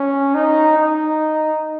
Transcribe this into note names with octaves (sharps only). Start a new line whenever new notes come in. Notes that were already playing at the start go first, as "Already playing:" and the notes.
Already playing: C#4
D#4
D#4